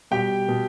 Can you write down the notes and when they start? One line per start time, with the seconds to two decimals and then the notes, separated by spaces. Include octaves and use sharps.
0.11 B2 G3 G4 G5
0.49 B2